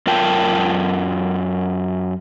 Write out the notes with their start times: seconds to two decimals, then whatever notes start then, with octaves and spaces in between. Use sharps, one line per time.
0.07 F#2 F4 A#4 G5 A5